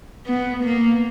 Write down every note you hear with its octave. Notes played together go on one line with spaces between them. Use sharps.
B3
A#3